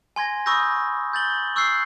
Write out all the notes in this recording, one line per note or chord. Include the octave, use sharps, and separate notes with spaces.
G#5 C6 G#6 A#6
B5 C#6 D#6 E6 G6 A#6
G6 A6 F#7 G7
C#6 E6 F#6 G6 C7